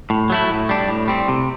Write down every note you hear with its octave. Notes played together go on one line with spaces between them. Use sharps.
A2
F#3 A3 E4
A2
G3 D4
A2
G3 C4
C3